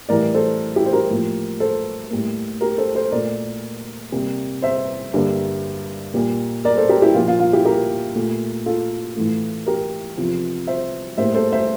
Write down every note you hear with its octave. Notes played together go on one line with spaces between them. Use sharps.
A2 E3 G3 A#4 D5
A4 C5
E4 G4
C5
G4 A#4
A2 F3 A#3
A4 C5
A2 G3 A#3
G4 A#4
A4 C5
A4 C5
A#2 A3 A#4 D5
C3 G3 A#3
C5 E5
G2 D3 G3 A#3
A#2 G3 A#3
A#4 D5
A4 C5
G4 A#4
E4 G4
A#2 F3 A#3 F4
F4
F4
E4 G4
G4 A#4
A#2 A3
F4 A4
A2 E3 A3
G4 A#4
E2 C3 F3
C5 E5
A2 G3 A#3 C5 E5
A4 C5
C5 E5